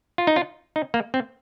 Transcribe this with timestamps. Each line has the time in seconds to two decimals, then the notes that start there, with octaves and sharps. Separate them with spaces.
0.18 F4
0.27 D#4
0.36 F4
0.76 D#4
0.94 A#3
1.14 C4